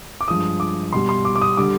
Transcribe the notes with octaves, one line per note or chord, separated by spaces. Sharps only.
D6
G2 F3 G#3 D#6
D6
B2 G3 C6
C6
D6
D6
D#6
D3 G3 D6